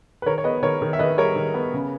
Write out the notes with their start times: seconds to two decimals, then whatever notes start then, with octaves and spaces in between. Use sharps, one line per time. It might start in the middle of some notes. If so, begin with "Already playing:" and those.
0.22 B4
0.26 D#3 A#4 C#5
0.38 C#5
0.44 B3 B4 D#5
0.63 D#3 A#4 C#5
0.82 D#3
0.93 E5
0.99 D#3 B4 D#5
1.18 G3 A#4 C#5
1.36 D#3
1.54 B3
1.74 C#3